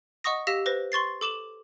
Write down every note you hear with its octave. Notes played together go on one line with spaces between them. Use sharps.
D#5 F#5 C#6 D#6 A#6
G4 F5 E6 A#6 B6 E7
B4 C5 A#6
C6 C#6 A6 C7
A4 D6 E7 F#7